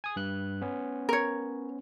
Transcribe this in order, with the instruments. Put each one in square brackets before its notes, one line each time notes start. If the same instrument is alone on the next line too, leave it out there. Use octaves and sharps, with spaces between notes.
[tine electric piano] G#5 D#6
G2 F#6
B3 C#4
[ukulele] A#4 C#5